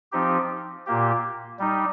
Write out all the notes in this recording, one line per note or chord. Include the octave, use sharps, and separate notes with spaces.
F3 C4 D#4 G4
A#2 A#3 G4
G3 D#4